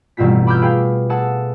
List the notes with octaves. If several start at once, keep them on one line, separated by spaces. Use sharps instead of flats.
A1 G2 B2 C4 F4 B6
B5 D6 E6 F6 G6
G#4 B4 F5 G5
G#4 A4 F#5 A5